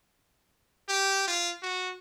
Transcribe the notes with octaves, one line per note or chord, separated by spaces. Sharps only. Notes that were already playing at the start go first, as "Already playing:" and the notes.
G4
F4
F#4